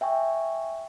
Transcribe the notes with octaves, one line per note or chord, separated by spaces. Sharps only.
E5 G5 G#5 C#6